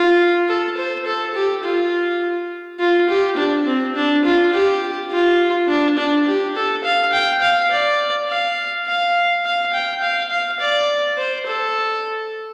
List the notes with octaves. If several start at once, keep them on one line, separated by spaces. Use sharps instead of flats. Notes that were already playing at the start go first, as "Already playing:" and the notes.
Already playing: F4
A4
C5
A4
G4
F4
F4
G4
D4
C4
D4
F4
G4
F4
D4
D4
G4
A4
F5
G5
F5
D5
F5
F5
F5
G5
F5
F5
D5
C5
A4